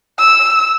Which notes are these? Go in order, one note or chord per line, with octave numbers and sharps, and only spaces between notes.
E6